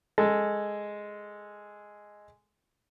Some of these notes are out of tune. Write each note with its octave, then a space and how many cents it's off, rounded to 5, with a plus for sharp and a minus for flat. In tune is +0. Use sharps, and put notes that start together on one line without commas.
G#3 +0 A4 +5